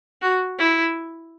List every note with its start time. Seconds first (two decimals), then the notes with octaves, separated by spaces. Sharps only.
0.22 F#4
0.59 E4